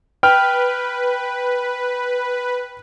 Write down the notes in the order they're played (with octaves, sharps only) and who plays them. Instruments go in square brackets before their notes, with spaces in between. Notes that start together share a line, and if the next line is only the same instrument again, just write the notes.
[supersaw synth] B4 [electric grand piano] G5 F6